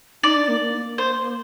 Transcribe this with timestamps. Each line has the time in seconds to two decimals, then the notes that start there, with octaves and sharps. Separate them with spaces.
0.23 D#4 D5
0.36 D4
0.48 A#3
0.61 A#3
0.98 C5